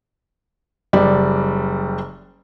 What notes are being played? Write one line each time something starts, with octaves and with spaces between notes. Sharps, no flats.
F#1 G3 D5